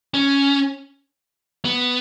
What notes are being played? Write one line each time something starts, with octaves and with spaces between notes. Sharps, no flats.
C#4
B3